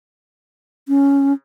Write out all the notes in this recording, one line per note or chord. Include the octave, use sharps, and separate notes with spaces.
C#4